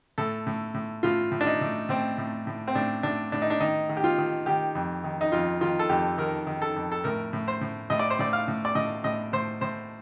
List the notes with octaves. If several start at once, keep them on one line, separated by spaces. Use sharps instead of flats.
A2 A4
A2
A2
A2 F4
A2
D4
D#4
A2
A2 C4
A2
A2
C4
A2 D4
A2 D4
A2 D4
D#4
D4
D#3 D#4
D#3
G4
F4
D#3
D#3 G4
F2
D#3
D#4
F2 F4
D#3 F4
A4
F2 G4
D#3 A#4
D#3
A4
F2
A4
A2 A#4
A2
C5
A2
A2 D#5
D5
C5
A2 D5
F5
A2
D5
A2 D#5
A2 D#5
A2 C5
A2 C5